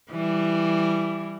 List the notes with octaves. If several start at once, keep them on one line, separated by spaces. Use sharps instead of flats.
E3 G3